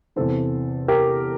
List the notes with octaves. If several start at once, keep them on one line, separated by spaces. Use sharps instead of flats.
E2 C3 E3 A4 C5
G4 A#4